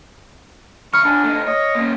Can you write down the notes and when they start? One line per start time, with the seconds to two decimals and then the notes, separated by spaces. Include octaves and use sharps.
0.94 D#3 B5 C#6 F6
1.05 F2 D4 G#5
1.24 A3 D#4
1.47 C#5 D#5
1.75 A#3 C#4